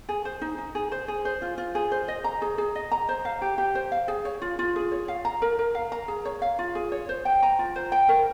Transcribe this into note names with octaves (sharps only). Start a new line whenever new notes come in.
G#4
C5
D#4
D#4
G#4
C5
G#4
C5
F4
F4
G#4
C5
D#5
A#5
G#4
G#4
D#5
A#5
C5
F5
G4
G4
C5
F5
G#4
C#5
F4
F4
G#4
C#5
F5
A#5
A#4
A#4
F5
A#5
G#4
C#5
F5
F4
G#4
C#5
C5
G5
A#5
F4
C5
G5
A#4